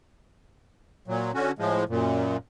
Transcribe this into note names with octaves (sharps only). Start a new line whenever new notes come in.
A#2 F#3
D3 C#4 F#4
A2 F3 G#3
F#2 A#2